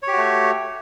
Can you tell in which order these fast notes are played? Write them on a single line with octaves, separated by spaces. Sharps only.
C#5 G4 F#4 A3